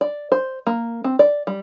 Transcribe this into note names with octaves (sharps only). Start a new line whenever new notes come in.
D5
C5
A#3
C4
D5
G3